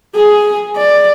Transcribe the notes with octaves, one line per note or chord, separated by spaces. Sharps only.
G#4
D5